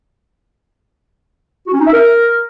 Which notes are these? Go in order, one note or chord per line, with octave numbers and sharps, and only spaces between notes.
F#4
C#4
D#4
E5
A#4